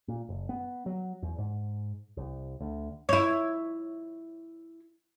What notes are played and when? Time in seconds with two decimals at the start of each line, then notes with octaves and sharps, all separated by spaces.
0.08 A#2
0.29 F#1
0.49 B3
0.86 F#3
1.22 E2
1.38 G#2
2.17 C2
2.60 D2
3.09 E4 C#5